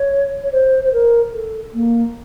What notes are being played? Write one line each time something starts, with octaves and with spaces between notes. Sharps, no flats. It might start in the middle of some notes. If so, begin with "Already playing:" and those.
Already playing: C#5
C#5
C5
C5
A#4
A4
A#3